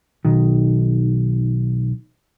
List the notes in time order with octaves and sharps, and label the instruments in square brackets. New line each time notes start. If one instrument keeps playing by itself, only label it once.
[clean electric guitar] B1 D#3